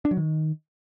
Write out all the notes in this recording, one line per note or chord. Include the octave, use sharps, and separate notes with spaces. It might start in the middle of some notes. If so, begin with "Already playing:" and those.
D4
F#3
D#3